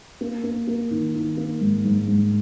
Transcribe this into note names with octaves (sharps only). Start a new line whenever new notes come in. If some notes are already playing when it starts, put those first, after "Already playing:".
A#3
A#3
A#3
D#3
D#3
A#3
G#2
G#2
G#2